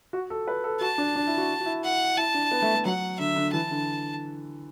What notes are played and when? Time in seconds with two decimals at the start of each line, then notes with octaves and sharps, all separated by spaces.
0.13 F#4
0.30 A4
0.48 B4
0.64 A4
0.81 F#4 A5
0.98 D4
1.16 D4
1.27 E4
1.37 F#4
1.60 F#4
1.66 E4
1.83 F#5
2.17 E4 A5
2.34 D4
2.51 B3
2.62 A3
2.75 A3
2.85 F#3 F#5
3.19 D3 E5
3.36 D3
3.53 E3 A5
3.71 D3